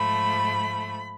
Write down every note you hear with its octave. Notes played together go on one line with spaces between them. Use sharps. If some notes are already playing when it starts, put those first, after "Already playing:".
Already playing: G#2 F3 A3 B5